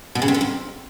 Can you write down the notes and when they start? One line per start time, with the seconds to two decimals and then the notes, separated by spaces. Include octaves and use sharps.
0.15 B2
0.22 C#3
0.28 C3
0.34 D3
0.41 F2